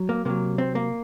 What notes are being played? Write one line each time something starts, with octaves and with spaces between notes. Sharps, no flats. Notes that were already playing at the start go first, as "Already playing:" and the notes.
Already playing: F#3
A#3
C3 F#3 A#3
C4
A#3